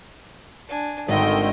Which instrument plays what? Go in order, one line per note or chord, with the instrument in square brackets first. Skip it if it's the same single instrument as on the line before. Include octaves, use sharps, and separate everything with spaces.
[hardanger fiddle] D4 G#5
[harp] G#1 [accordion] D3 D#3 [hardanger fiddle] D#5 G5